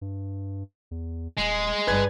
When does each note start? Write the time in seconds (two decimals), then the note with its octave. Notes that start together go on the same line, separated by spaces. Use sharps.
0.01 G2
0.91 E2
1.38 D#1 G#3
1.87 G1 G2 B4 G#5 G#6